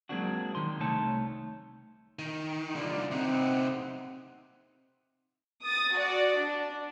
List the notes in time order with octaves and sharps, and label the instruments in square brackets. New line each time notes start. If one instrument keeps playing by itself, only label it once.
[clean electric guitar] F#3 G#3 A#3 C4 D4 F#4
D#3 D#4 C6
C2 C3 A3 D#4 C#5 A5
[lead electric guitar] D#3
[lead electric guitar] C2 D3 [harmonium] D#4 F4 D5
[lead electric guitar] C3 D#4 [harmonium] C4 F#5
[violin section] D#6 A6
F#4 D5
D4